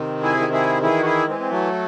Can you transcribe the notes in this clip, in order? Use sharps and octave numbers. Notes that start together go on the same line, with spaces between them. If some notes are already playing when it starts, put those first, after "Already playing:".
Already playing: C3 D#3
E4 G#4
D#3
E4 G#4
E3 E4 G#4
F#4
E4 G#4
E3 G#3 C4
C4
F#3 A3